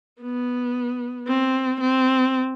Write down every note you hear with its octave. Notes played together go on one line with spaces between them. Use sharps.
B3
C4
C4